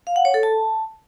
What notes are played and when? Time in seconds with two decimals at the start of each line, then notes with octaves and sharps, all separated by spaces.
0.07 F5
0.16 F#5
0.25 C#5
0.34 A4
0.43 A5